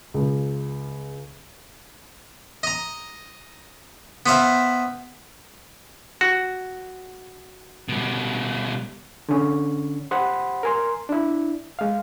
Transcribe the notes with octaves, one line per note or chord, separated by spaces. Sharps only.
C#2
D#5 A#5
B3 C5 E5 F5
F#4
B2 G3
D3 C#4
G4 C5 F#5 B5
A#4 G#5 C6
D4 E4
G#3 F5